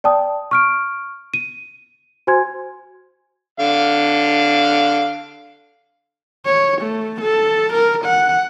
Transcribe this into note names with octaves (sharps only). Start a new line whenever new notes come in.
D5 G5 A5 D#6
C#6 F6 D7
D#7
F#4 C5 G#5 C6 G#6
D3 F5
C#5
A3
A4
A#4
F#5